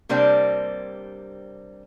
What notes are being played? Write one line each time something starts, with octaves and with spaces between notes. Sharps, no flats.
C3 G3 A#3 C4 D4